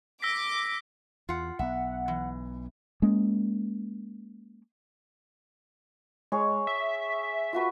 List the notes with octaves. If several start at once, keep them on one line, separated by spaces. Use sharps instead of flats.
D6 E6 A#6 B6
E2 F4 F#5
B1 B3 E5 F#5
E3
G#3 A#3 C#4
G#3 G#4 C#5
E5
F4 F#4 B4